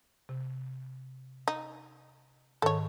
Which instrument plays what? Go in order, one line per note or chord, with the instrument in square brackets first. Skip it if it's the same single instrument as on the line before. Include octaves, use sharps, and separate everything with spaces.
[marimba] C3
[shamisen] D#4
[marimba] G#2 D#3 [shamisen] A4 C#5